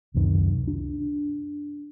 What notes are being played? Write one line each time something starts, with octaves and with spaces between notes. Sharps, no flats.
C#2 F#2 C3 D#3
D4